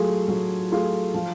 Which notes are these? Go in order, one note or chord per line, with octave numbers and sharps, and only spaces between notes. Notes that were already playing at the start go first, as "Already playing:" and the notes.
Already playing: F#3 A3 F4 G#4
F#3
A3 F4 G#4
F3